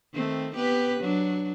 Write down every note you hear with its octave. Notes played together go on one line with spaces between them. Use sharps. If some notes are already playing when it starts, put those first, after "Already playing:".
D#3 A3 C4
B3 G4 B4
F#3 D4